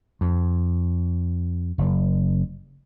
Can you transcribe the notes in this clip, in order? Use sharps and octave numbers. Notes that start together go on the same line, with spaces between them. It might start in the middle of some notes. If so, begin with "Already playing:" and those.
F2
F#1